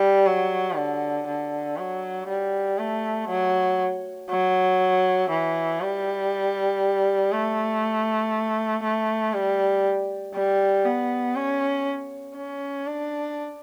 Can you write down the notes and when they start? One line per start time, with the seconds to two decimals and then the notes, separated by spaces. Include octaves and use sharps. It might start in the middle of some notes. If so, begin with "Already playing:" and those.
Already playing: G3
0.26 F#3
0.77 D3
1.27 D3
1.78 F#3
2.28 G3
2.78 A3
3.29 F#3
4.30 F#3
5.30 E3
5.81 G3
7.32 A3
8.83 A3
9.34 G3
10.35 G3
10.85 B3
11.36 C#4
12.36 C#4
12.87 D4